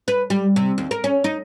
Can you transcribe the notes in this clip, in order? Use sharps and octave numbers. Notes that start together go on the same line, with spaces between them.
B4
G3
C3
D#2
A#4
C#4
D#4